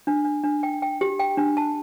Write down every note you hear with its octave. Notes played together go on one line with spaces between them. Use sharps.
D4
D4
D4
G5
G5
G4
G5
D4
A5